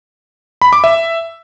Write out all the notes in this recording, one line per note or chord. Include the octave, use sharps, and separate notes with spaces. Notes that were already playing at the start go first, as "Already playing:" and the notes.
B5
D6
E5